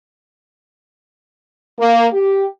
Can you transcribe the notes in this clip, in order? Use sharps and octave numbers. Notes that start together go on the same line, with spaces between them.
A#3
G4